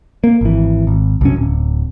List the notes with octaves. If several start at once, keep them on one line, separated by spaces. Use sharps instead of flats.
A#3
G#1 E3
G#1
C2 F#2 C#4
D1